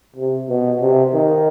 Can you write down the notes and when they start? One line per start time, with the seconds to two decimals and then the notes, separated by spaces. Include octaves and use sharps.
0.16 C3
0.49 B2
0.81 C3
1.14 D#3